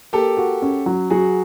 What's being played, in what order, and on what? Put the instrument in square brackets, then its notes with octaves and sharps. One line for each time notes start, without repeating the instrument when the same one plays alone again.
[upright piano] A#3 [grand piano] G4 A4
[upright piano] F#4
C#4
F#3
[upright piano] F#3 [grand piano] F#4 G#4